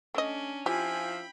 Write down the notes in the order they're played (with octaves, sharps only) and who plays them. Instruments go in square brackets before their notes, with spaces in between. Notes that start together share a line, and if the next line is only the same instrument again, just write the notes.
[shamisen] A3 D#5 [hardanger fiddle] C#4 D4
[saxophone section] F3 E4 F4 [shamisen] G4 [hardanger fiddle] G5 B5 [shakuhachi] G#5